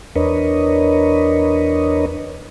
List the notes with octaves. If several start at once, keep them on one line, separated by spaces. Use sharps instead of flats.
E2 D4 A#4 B4 C#5 D#5